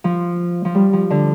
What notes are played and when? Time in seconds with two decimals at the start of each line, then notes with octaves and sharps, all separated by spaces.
0.04 F3
0.65 F3
0.75 G3
0.93 F3
1.10 D3